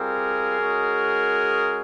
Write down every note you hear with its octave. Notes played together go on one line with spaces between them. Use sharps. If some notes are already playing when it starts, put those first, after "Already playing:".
Already playing: G3 C4 F4 G#4 A#4
G#3 C#4 F#4